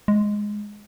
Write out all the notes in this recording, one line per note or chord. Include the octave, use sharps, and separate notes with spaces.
G#3